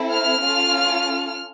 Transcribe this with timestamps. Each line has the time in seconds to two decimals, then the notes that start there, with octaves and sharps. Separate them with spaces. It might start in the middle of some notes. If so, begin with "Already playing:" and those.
Already playing: C4 E4 A4
0.10 F6
0.41 C#4 F4 A4